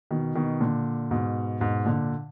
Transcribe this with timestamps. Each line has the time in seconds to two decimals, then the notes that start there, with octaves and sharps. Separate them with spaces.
0.11 B2 D#3
0.35 B2 D#3
0.61 A#2 D3
1.11 G#2 B2
1.60 G#2 B2
1.86 A#2 D3